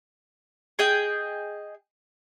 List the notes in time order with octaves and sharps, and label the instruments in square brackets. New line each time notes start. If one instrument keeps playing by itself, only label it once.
[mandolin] G#4 D#5 G5